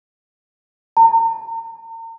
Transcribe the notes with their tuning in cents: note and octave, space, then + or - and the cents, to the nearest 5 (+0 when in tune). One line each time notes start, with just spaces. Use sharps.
A#5 -40